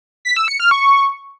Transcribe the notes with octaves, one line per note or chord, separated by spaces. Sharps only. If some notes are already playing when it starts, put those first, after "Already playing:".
B6
E6
C#7
F6
C#6